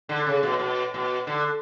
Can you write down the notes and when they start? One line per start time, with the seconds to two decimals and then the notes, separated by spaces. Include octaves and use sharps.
0.09 D3
0.26 C#3
0.43 B2
0.59 B2
0.94 B2
1.27 D3